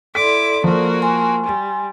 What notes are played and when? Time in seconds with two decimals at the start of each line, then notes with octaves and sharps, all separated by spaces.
0.15 E4 A4 D5 C6 D6 B6
0.64 F3 A#3 F#4
1.02 G#5 C6
1.45 G3